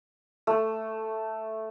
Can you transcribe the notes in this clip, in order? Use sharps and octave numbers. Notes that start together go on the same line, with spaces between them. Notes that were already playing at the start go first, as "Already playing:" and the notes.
A3